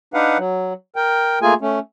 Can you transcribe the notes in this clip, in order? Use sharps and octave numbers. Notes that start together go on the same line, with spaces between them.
D4 D#4 B4 F5 F#5
F#3
A#4 G5
A3 A#3 F4 G#4 G#5
A3 C#4